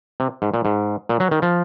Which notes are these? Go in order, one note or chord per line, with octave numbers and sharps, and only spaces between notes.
C3
G#2
A#2
G#2
A#2
F#3
D#3
F3